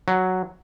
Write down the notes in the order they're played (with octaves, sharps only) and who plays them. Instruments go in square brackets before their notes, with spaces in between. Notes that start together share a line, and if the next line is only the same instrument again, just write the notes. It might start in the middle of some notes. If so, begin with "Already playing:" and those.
[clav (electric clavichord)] F#3